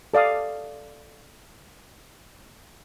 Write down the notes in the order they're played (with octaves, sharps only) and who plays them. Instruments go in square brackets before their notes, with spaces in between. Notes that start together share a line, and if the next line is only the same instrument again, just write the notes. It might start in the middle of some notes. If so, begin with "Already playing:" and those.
[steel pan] A4 D5 F5 D#6